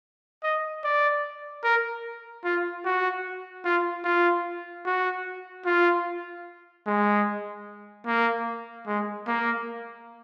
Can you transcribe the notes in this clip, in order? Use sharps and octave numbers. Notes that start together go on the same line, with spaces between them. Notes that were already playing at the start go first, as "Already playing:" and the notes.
D#5
D5
A#4
F4
F#4
F4
F4
F#4
F4
G#3
A#3
G#3
A#3